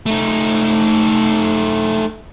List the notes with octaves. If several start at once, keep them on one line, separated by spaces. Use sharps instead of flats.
A3 D#4